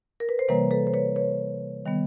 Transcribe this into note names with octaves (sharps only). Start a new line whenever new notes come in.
A#4
B4
C5
C3 E3 G3 A#3 B4 C#5
A4 B4
C5
B4 C#5
B4 C#5
D#3 G3 B3